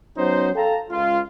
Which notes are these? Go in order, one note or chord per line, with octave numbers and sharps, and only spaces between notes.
F#3 B3 C#4 D#4 C5
A4 F5 G5 A5 A#5
C#2 F4